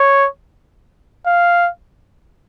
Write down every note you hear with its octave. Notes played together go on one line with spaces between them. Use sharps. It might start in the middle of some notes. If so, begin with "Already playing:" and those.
Already playing: C#5
F5